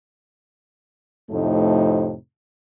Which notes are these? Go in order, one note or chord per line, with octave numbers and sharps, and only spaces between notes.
F2 A2 C3 A3 D#4